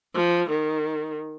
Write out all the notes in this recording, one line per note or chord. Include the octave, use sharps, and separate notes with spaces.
F3
D#3